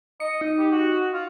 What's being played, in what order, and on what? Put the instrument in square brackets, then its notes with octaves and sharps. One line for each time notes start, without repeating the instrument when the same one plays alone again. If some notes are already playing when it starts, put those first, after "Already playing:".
[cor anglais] D#5 [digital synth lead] C#7
[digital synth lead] D#4
[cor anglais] G4
F#4
F4